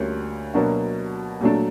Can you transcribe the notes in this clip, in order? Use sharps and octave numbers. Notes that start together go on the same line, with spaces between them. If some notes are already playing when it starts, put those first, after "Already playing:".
Already playing: D2 D3 G3 A#3 C#4
B2 F#3 A#3 D4 F#4
A#2 F#3 A3 D4